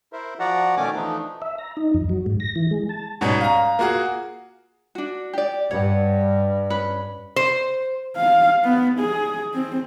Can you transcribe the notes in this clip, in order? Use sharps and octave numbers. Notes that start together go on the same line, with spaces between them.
E4 A#4 C5 E5
F3 F#4 D5 F#5 A#5
B2 D#3 A3 C#4 G#5 D6
E3 F3 A3 D4 D#4
E5
A#5
D#4
F2
F#3
G#2
A#6
E3
G#3
A5
G#2 B2 G3 B3 C#4
F5 A#5
A#3 F4 F#4 G#4
D4 F#4
G4 D5
G2 C#5 F#5
C#4 B4
C5
F5
B3
G#4
C4